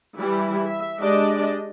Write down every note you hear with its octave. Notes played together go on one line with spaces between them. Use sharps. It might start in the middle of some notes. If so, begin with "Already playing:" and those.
E3 G3 E4 G4
E5
G#3 D4 G4 D5 D#5